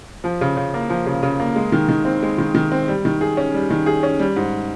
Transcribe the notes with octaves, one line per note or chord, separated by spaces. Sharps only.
F3
C#3
C#3
A#3
F3
C#3
C#3
A#3
G#3
D#3
D#3
C4
G#3
D#3
D#3
C4
G3
D#3
G#4
C#4
G3
D#3
G#4
C#4
G3
G#2